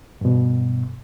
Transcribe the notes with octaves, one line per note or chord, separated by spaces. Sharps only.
G2 B2